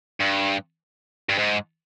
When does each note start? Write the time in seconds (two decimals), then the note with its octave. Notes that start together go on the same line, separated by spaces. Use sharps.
0.21 G2
1.29 G2
1.38 G#2